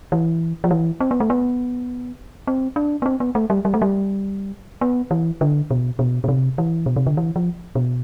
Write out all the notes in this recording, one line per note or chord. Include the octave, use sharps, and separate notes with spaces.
E3
F3
E3
C4
B3
A3
B3
C4
D4
B3
C4
B3
A3
G3
G3
A3
G3
B3
E3
D3
B2
B2
B2
C3
E3
B2
C3
D3
E3
F3
B2